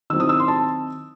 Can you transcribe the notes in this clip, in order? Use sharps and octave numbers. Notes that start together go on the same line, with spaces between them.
D#3 F#3 C4 E4 E6
D#6
E6
C6
A5